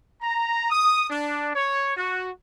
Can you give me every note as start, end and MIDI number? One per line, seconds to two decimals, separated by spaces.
0.22 0.66 82
0.71 1.09 87
1.10 1.50 62
1.55 1.93 73
1.97 2.30 66